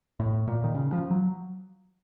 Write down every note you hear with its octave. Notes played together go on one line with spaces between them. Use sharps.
A2
A#2
D#3
C#3
F3
F#3